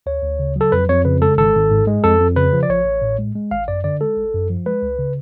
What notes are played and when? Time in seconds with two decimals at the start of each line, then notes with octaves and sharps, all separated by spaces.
0.06 D2 C#5
0.23 D2
0.39 C#3
0.56 F#3 A4
0.72 F2 B4
0.89 F2 C#5
1.05 C#3 B4
1.21 G#3 A4
1.38 G#1 A4
1.54 G#1
1.71 G#2
1.87 G#3
2.04 F2 A4
2.20 F2
2.36 C#3 B4
2.53 F3
2.63 D5
2.69 A1 C#5
2.86 A1
3.02 A2
3.18 G#3
3.35 G#3
3.51 G#1 F5
3.68 F#2 D5
3.84 D3 D5
4.01 G#3 A4
4.17 G#1
4.34 F#2
4.50 F3
4.66 G#3 B4
4.82 C#2
4.99 C#3